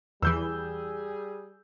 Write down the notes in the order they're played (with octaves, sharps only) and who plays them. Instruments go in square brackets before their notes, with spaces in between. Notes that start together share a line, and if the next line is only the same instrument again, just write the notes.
[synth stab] E2 E3 [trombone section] G3 G#4 [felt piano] E6 G6